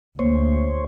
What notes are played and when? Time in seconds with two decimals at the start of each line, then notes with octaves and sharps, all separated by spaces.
0.19 D2 A#3 C5 C#5